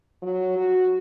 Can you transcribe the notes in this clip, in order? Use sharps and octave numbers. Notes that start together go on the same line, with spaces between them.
F#3
F#4